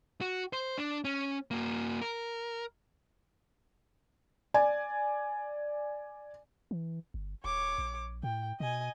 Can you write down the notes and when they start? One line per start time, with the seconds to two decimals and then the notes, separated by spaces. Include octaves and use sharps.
0.21 F#4
0.53 C5
0.78 D4
1.04 C#4
1.51 A#3 F#4
2.01 A#4
4.54 D5 G#5
6.71 E3
7.14 G1
7.44 D#1 C#5 D6
7.78 A#1
8.23 A2 G5
8.60 B2 D#5 G#5